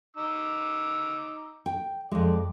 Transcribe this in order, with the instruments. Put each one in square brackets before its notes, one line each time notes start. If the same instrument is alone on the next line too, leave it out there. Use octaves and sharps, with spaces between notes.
[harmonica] D#4 D6 E6
[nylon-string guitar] G5
[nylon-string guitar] F2 G#3 [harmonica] D5